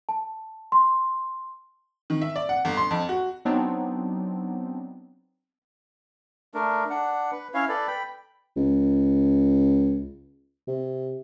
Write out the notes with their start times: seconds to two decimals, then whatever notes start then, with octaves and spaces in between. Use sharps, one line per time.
0.09 A5
0.72 C6
2.10 D#3
2.22 E5
2.36 D5
2.49 F#5
2.65 G1
2.77 C6
2.91 F2
3.09 F#4
3.45 F#3 B3 C4 D4 D#4
6.54 A3 D4 A#4
6.90 D4 F#5
7.32 B4
7.54 C#4 E4 C#5 F5
7.69 A4 B4 D5
7.88 G5 B5
8.57 C#2
10.67 C3